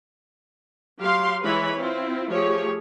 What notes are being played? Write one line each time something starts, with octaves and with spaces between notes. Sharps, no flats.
F#3 G4 F5 C6
E3 G#3 E4 B4 C#5 B5
C4 E4 F4
F3 A3 G4 G#4 C#5